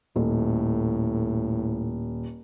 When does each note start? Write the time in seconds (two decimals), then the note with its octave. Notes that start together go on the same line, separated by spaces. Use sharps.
0.16 D#1 A2